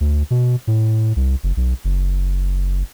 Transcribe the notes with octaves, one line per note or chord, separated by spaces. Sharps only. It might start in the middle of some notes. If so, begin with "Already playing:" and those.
D2
B2
A2
C2
F#1
B1
F#1